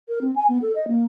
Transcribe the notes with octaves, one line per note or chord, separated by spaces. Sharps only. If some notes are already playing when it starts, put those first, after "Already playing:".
A#4
C4
G#5
B3
A4
D#5
A#3